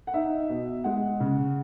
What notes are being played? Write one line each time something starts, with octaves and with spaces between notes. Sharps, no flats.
F#5
D#4 E5
B2
G#3 F#5
C#3